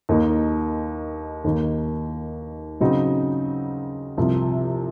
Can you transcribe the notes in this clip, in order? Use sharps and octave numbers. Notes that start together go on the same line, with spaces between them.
D#2 D#3 A#3 D#4
D#2 D#3 A#3
C#3 F#3 C4 D#4 F#4
C2 C3 F3